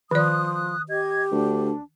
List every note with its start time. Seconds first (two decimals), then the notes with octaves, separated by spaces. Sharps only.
0.11 D#3 F3 D5 D#6 F#6
0.89 G4 D#5 G#6
1.32 D2 D4